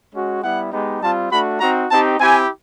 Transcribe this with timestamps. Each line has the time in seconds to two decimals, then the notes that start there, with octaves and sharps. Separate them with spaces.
0.14 G#3 C#4 F#4
0.42 G3 B3 E4 F#5
0.72 G#3 B3 D#4 G4
1.01 G3 C4 F4 A5
1.31 A3 D4 F#4 B5
1.60 C4 D#4 F#4 A#5
1.90 C4 D#4 G4 A5
2.20 C4 E4 G4 G#5